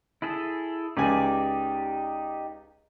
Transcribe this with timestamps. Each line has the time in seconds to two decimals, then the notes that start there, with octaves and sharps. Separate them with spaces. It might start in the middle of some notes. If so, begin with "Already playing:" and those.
0.22 E4 G#4 A4
0.97 C#2 D#4 G4 D5 G#5